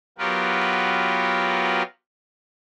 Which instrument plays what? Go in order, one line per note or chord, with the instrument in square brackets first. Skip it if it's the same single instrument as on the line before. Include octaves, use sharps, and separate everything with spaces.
[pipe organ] F#3 B3 F4 G4 A#4 B4